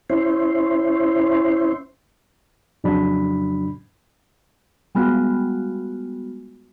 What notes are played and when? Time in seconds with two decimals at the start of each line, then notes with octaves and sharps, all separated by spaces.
0.10 C#4 E4 C5
2.84 F2 C#3 F#3 D4 B5
4.95 G3 G#3 B3 F4 F#4